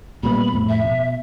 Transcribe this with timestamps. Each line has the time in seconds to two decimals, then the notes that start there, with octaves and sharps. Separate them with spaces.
0.23 A#2 G3 B3 B5
0.53 F2 A2
0.69 E5
0.84 B2